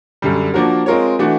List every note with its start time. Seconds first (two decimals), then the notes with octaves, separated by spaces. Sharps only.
0.22 F#2 D3 G3
0.54 F3 A#3 D4 F#4 A#4
0.86 G#3 C4 F4 A#4 C#5
1.19 E3 A3 D4 F#4